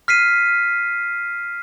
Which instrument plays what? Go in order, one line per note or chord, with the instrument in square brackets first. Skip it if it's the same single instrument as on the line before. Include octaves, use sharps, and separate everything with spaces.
[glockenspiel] F6 B6 C7 D#7